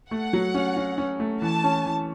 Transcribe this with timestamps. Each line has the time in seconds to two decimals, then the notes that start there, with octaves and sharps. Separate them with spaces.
0.11 A3 F#5
0.33 F#3
0.54 C#4
0.77 C#4
0.98 C#4
1.20 A3
1.42 E3 A5
1.64 C#4
1.86 E3